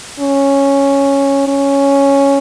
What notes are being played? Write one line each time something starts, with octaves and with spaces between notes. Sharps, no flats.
C#4
C#4